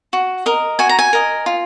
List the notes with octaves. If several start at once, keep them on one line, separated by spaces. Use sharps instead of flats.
F#4
A#4 D#5
F#4 G#5
A#5
G#5
A#4 D#5
F4